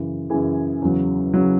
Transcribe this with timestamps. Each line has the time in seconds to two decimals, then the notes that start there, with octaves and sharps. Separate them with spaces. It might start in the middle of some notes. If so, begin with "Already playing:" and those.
Already playing: F#2 C#3 E3
0.30 F#2 C#3 E3 G#4 G#5
0.82 E2 C#3 F#3
1.34 C#3 F#3